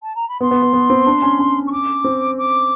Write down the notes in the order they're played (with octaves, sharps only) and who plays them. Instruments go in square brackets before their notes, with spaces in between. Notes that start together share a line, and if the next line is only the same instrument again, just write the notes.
[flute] A5
A#5
B5
[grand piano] B3 [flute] C6
[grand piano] B3
B3
B3
C4
D4
C#4
C#4
[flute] C#6
D6
[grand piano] C4
[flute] D6